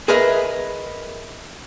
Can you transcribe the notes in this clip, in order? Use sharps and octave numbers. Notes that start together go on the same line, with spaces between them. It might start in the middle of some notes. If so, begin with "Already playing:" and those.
G#4 A#4 B4 D#5 E5